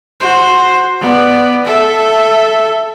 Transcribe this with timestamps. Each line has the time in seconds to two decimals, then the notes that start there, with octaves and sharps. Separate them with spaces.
0.21 F#4 C5
1.01 B3 D5
1.66 A4 E5